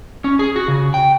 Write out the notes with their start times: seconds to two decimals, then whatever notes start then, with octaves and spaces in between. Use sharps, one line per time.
0.24 C#4
0.39 G#4
0.56 F#4
0.68 C#3
0.94 G5